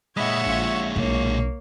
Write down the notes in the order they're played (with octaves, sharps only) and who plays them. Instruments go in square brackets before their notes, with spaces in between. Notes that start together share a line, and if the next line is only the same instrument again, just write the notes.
[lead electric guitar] A#2 G#3 [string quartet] C#5 E5 F#5 [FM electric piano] D#5 B5
[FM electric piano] A#1 F4 C#6
[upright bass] B1 D4 [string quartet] A#3 C#5